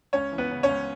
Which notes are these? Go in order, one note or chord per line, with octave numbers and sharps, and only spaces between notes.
C#2 C#4 C#5
E3
B3 B4
C#3
C#4 C#5
C#2